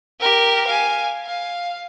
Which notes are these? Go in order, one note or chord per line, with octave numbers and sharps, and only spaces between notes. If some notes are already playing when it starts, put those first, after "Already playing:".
G4 A#4
F5 G#5
F5